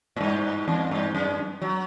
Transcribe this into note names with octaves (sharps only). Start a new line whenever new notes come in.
A2
G2
E2
G2
F#2
F#3